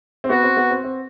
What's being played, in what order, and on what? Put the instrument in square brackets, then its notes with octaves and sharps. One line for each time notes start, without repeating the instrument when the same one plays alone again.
[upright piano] C4
[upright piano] B3 [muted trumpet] F#4
[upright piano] C4
B3
C4
C4